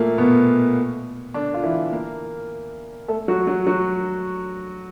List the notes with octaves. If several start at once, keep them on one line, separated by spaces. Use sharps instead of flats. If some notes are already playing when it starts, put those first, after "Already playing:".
Already playing: A#2 A3 A#3
B2 B3
D3 D4
F4
E3 E4
A#3 A#4
A3 A4
F#3 F#4
F#3 F#4
F#3 F#4